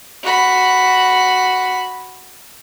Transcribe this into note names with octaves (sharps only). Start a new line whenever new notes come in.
F#4 B5